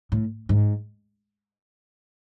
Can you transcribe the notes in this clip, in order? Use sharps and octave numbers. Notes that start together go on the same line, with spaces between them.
A2
G#2